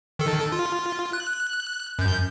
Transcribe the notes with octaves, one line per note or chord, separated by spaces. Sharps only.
D#3 A4
F4
F#6
F#2 G6